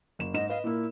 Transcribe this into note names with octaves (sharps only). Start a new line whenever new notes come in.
F#1 E7
G#2 D#5 E7
B4 D#5 F5
A#2 A#3 E4